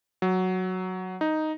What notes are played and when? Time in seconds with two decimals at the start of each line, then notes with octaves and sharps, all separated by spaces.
0.22 F#3
1.21 D#4